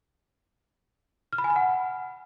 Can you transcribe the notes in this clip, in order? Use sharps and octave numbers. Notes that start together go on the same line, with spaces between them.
F6
B5
G#5
B5
F#5